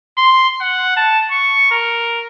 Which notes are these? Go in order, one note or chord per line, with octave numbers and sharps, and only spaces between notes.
C6
F#5
A5
C#6
A#4